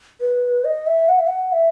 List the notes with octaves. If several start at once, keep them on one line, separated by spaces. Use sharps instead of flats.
B4
D#5
E5
F#5
E5
F#5
E5